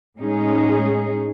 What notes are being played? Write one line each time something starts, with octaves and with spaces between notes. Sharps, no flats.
A2 G#3 C#4 D#4 G#4